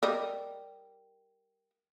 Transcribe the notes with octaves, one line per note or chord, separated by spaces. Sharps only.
G3 A#4 D#5